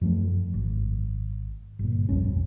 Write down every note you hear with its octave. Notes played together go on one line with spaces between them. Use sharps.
F#2 F3 A3
G#1
G1 A#2
B1 F2 G3 C#4